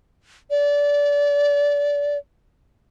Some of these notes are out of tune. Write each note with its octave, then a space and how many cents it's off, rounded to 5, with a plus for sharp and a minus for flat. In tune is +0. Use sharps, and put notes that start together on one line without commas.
D5 -25